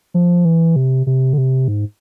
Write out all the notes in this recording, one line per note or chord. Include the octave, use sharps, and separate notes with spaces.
F3
E3
C3
C3
D3
C3
G#2